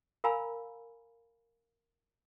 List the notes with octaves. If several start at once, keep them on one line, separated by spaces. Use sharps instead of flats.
A#4 F5 G#5 A#5 B5 E6